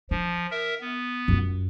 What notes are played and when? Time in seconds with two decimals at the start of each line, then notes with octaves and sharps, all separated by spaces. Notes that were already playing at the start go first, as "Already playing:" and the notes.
0.11 F3 D4
0.51 A#4 E5
0.81 B3
1.28 F#2 F4